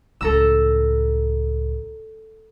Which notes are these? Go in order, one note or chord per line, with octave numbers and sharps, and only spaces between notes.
C#2 A2 A4 A#5 E6